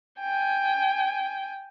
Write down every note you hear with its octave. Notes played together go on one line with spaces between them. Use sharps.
G5 G#5